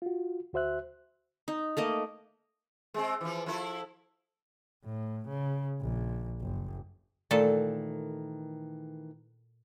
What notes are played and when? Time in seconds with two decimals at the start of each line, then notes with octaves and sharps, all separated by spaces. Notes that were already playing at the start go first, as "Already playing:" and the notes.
0.02 F4 F#4
0.53 D2 F#4 C5 E5 F#6
1.48 D#4
1.77 A3 A#3 D#5
2.94 G#3 C4
3.21 E3 F3
3.46 F3 E4 A4
4.85 A2
5.28 C#3
5.81 A#1
6.41 F#1
7.31 A#2 D#3 E3 A3 A4